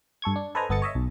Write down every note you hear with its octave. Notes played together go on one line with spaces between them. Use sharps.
G2 A4 C#6 G#6
D4
A4 B4 C5 D#5 G#5 A#5
G1 B3 A4 D#5 A6 C#7
C#5 D#5 E5
B1